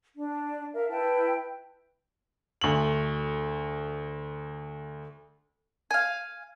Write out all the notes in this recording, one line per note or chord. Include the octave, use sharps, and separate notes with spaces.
D4
A#4 E5 F5
E4 B4 G5 A5
D2 F#7
F5 G#5